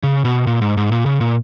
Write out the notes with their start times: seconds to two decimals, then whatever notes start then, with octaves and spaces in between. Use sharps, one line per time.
0.03 C#3
0.25 B2
0.47 A#2
0.62 G#2
0.77 G#2
0.92 A#2
1.06 C#3
1.21 A#2